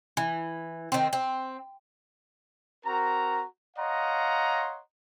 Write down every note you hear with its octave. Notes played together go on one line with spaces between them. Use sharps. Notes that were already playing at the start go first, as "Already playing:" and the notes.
E3
D#3 C4
C4
C4 F#4 A#4 A#5
C#5 D#5 F5 F#5 A#5 C6